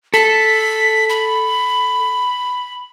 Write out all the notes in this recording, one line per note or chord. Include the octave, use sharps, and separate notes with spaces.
A4 B6
B5